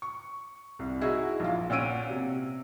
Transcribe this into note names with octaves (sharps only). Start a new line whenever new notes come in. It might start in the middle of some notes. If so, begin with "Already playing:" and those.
C#6
C2
D#4 E4 F#4 G#4
A#1 F4
A#2 C#4 F#5 E6 D7 D#7
C3